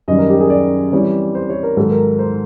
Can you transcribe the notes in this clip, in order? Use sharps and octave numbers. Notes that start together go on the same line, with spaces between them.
F#2 D#3 G3 D#5
A#4
G4
G#4
D5
E3 G3 C4 C#5
C5
C#5
A#4
G#2 D#3 F#3 A4
A#4
C5